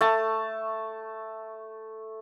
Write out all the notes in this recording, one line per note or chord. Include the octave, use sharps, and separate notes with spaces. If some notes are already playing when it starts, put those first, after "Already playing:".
A3 A5